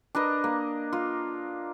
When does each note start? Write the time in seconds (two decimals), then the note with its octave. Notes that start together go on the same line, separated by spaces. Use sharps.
0.15 D4 A#4 B4 D#5
0.44 A#3
0.93 F4